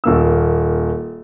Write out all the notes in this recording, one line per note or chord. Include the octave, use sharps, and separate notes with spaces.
D#1 A#3 E6